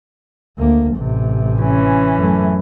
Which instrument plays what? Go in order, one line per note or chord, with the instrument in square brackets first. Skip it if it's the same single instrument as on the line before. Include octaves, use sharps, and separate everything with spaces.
[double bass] D2 A#3
A1 C3
[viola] E3 C#4
[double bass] F#2 A3